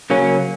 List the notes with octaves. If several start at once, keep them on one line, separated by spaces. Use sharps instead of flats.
C#3 F#3 A#3 C#4